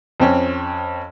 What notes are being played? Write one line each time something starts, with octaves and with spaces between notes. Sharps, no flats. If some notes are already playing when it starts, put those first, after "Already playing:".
F2 C4 C#4